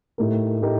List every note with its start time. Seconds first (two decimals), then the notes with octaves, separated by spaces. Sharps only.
0.18 A2 A3 D#4 G4 A#4
0.62 A2 A3 D#4 G4 A#4